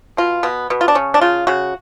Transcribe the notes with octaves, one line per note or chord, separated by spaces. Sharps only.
B2 F4
B2 B3
B2 B3
F4
D4
C#3 C#4
D4
C#3 F4
C#3 F#4